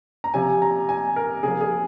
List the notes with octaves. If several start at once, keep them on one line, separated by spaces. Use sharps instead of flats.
A#5
C3 F3 G#5
A#5
G#5
A#4
C3 F3 G#4
G#4